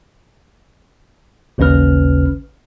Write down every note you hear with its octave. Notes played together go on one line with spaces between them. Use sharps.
A1 D#2 C#3 C#4 B4 F6